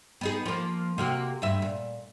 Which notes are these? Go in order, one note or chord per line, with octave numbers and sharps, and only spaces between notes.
B3 D#4 G#4
F3 A#3
C3 A#3 F#4
D2 G2 E5
A#2